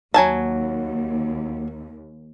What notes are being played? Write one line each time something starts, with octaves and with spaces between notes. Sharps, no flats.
D#2 F#3 G#5 A5